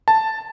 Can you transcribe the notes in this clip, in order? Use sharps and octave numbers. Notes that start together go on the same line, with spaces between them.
A5